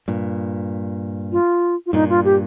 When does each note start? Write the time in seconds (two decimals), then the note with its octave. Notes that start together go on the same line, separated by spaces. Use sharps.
0.08 G2 A#2
1.32 F4
1.86 F4
1.93 G2 A#2 D#4
2.09 F4
2.25 G4